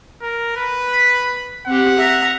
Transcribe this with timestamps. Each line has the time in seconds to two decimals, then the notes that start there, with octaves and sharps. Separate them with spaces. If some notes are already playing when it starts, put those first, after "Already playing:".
0.22 A#4
0.57 B4
0.89 B5
1.67 C4 G4 F#5
1.98 E5 A#5